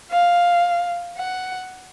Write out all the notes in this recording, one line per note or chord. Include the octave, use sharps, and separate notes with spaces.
F5
F#5